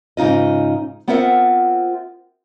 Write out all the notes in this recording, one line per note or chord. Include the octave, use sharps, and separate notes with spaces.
G#2 C#3 D#4 F4 D#5
B3 C4 F4 A#4 E5 F#5